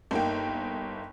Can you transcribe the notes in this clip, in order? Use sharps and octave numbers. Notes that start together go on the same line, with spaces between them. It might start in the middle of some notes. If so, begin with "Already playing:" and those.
G1 A#3 D#4 G5